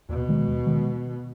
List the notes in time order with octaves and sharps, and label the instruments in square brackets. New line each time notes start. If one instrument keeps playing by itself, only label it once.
[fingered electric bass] D#2 [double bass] B2
[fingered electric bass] D#3 G#3
D#2
D#3 G#3